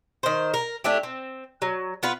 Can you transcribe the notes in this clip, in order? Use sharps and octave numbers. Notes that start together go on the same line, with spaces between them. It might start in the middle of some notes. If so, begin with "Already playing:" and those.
D#3 C5
A#4
A3 D4 E4 G4
C4
F#3
B3 F4 B4